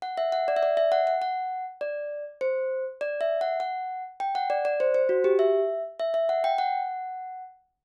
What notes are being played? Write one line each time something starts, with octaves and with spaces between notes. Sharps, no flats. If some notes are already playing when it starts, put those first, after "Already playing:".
F#5
E5
F#5
D5
E5
D5
E5
F#5
F#5
F#5
D5
C5
D5
E5
F#5
F#5
G5
F#5
D5
D5
C5
C5
F#4
G4
E5
E5
E5
F#5
G5
F#5